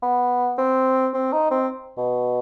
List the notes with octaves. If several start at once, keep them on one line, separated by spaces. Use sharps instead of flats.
B3
C4
C4
D#4
C4
B2